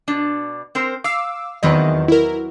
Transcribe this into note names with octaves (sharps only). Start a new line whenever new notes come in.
B2 D4
C4 A#4 C5
F5 D6 E6
E2 D#3 F#3 C4 B4 D#5
E4 A#4